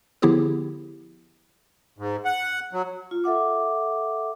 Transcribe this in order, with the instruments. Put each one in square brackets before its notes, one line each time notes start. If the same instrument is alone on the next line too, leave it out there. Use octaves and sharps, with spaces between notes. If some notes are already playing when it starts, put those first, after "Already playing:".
[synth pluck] D3 F3 B3 E4 G4 G#4
[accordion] G#2
F#5
F#3
[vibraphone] F4
A4 E5 F#5 D6